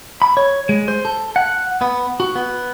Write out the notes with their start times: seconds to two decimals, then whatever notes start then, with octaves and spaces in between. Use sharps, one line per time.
0.22 B5
0.37 C#5
0.69 G#3
0.88 C5
1.05 A4
1.36 F#5
1.81 B3
2.20 F#4
2.35 B3